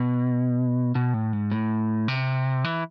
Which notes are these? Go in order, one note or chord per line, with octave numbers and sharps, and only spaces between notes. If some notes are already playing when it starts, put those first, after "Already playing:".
Already playing: B2
B2
A2
G#2
A2
C3
E3